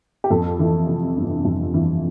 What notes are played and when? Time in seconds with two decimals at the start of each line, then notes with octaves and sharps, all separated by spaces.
0.24 G4
0.30 F2 A4
0.59 E3
0.87 C3
1.17 G1
1.45 F2
1.74 E3